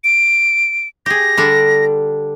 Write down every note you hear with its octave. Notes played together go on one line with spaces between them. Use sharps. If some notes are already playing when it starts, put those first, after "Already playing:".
D7
G4 G#4 A#6
D3 G3 D4